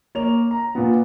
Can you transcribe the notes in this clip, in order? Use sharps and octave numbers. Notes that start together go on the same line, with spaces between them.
A#3 C#5 F7
A#5
A#2 B3